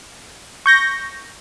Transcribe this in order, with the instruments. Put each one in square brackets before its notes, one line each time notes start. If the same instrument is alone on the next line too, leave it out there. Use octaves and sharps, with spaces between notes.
[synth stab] C#6 G6 A#6